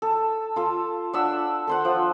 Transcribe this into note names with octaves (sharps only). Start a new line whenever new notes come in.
A4
F4 A4
D4 E5 F#5 E6
A4 C5 F#5
F3